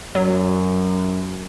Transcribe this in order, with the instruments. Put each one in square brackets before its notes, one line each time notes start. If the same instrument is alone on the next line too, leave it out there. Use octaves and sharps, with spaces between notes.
[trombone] F#2 [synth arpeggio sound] F#3